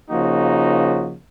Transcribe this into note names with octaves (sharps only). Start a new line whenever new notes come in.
C#3 F3 A#3 D#4 F#4